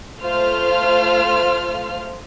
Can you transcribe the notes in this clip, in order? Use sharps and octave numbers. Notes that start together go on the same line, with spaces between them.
A3 F4 C5 F6